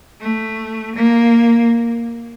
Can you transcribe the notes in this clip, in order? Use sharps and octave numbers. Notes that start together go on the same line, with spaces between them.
A3
A#3